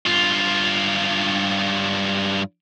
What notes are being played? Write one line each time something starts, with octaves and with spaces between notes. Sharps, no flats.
G2 F4